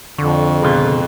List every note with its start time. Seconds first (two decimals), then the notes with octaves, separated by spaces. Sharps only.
0.18 F2 D3 C#6
0.62 C#2 B2 F4 G#4